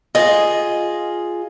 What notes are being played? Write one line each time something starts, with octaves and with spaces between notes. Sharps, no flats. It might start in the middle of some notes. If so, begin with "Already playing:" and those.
F4 G#4 D#5